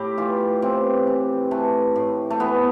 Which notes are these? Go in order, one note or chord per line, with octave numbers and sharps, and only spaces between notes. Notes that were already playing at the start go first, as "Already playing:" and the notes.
Already playing: A2 G4
E3 F4
E3 C4
E3
E3 A3
A2
A3
E3 B3